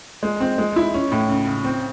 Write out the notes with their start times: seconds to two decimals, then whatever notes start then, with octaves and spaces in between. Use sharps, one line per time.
0.23 G#3
0.40 C4
0.58 G#3
0.76 E4
0.94 C#4
1.12 A2
1.29 C#3
1.47 C#3
1.64 C4